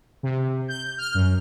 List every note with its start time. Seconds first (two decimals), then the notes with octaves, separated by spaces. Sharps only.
0.23 C3
0.68 G6
0.98 F6
1.14 F#2